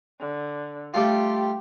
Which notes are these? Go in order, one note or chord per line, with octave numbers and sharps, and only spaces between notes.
D3
G3 A3 F4 G4